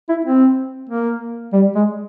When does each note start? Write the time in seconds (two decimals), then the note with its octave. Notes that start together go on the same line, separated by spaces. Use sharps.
0.09 E4
0.25 C4
0.90 A#3
1.53 G3
1.75 G#3